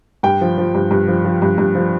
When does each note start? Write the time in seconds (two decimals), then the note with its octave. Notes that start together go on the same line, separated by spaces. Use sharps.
0.23 G2 G5
0.41 F3
0.58 F3
0.75 G2
0.91 G2
1.08 F3
1.25 F3
1.42 G2
1.58 G2
1.75 F3